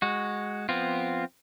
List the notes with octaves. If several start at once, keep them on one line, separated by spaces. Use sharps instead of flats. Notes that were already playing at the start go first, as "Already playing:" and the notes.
G#3 F#4
F3 B3 C4 F4